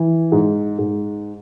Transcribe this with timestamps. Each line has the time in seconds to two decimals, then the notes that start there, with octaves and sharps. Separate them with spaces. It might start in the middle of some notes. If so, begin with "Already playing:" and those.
Already playing: E3
0.32 G#2
0.79 G#2